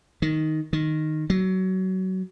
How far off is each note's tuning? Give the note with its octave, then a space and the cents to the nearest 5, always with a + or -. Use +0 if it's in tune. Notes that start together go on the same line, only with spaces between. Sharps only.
D#3 +5
D#3 -5
F#3 +20